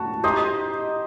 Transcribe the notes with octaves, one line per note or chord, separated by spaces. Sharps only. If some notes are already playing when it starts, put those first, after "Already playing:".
Already playing: F#4 A5
D#4 G4 C5 D#5 D#6